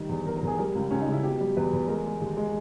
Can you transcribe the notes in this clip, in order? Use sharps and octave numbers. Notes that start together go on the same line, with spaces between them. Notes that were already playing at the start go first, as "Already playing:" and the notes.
Already playing: D#3 G3
E2
E2 A#4
A#4
E2 G#4
G3 A#4
C#2
C#2 C#4
D#4
C#3 E4
B2 G4
G3
E2 B4
E2
G#3 A#4
G#3
D#2
G#3